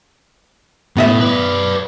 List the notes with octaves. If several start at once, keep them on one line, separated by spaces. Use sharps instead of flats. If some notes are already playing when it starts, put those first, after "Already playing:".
A2 B3 D#5 E5
B4 D5